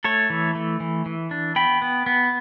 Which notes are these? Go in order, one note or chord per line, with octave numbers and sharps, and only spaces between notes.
A3 A4 C#5
E3
A3
E3
E3
D4
B3 G5 B5
B3
B3